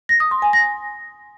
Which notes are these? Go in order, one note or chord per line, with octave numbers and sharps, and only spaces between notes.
A#6
D#6
C6
G#5
A#6